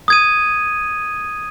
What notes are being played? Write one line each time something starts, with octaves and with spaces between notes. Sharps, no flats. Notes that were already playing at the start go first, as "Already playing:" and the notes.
D#6 G#6 D#7